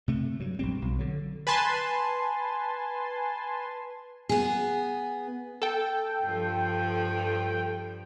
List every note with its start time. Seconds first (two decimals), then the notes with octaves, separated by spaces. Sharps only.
0.08 C3 A3
0.40 G2 F#3
0.59 A#1 G3 C4
0.82 B1 B2
0.99 D3 F#3
1.47 B4 G#5 A5 C6
4.29 B3 G#4
5.62 A4 G5
6.24 G2 F3